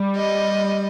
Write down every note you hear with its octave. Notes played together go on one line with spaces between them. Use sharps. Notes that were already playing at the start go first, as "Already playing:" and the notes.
Already playing: G3
D#5